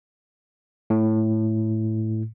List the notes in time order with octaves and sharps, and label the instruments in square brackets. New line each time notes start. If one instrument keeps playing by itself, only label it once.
[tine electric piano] A2